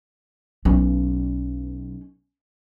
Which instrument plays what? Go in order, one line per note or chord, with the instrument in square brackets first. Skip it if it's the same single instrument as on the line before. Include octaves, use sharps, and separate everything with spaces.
[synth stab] B1 [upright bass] C#4